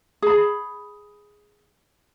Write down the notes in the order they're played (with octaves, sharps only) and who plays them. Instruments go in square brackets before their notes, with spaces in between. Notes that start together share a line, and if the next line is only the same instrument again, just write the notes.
[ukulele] G#4 B5